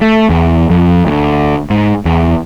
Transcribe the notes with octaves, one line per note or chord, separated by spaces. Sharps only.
A3
E2
F2
D2
G#2
E2